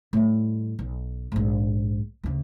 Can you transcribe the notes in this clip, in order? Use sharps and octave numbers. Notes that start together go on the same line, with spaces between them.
A2 G3
B1
A#1 G#2
D2 C#3